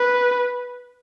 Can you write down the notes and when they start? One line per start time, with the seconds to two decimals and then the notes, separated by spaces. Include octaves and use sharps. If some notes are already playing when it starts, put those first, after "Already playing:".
Already playing: B4